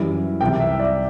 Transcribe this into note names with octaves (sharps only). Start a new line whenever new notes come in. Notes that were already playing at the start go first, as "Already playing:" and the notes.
Already playing: F#2 E3 G3
C2 C3 E3 G5
E5
D5